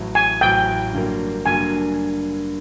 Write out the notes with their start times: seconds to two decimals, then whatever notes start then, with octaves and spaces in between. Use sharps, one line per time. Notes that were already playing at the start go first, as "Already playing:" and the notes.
Already playing: A1 A2 F#3
0.15 G#5
0.41 A1 A2 F#3 G5
0.93 G2 D3 F#3 A#3
1.46 G2 D3 F#3 A#3 G#5